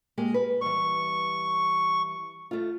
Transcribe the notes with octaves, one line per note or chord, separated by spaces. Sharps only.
G#3 A#3 G4
B4
E3 G3 C#6
A3 F4